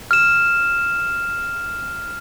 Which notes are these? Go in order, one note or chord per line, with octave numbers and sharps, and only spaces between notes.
F6 E7